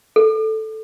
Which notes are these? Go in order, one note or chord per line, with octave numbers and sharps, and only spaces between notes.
A4